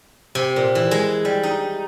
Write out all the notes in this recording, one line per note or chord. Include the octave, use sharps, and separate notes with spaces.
C3
A#2
E3
G#3
G3
D#4